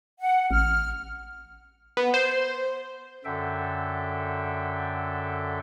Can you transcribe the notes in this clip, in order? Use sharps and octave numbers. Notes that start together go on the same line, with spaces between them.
F#5
A1 F6
B3
C5
F#2 D3 A4 E5 G5